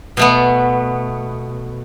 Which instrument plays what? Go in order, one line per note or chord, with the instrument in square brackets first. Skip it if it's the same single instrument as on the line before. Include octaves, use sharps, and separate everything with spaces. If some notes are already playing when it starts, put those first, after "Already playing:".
[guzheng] B2 A3 B3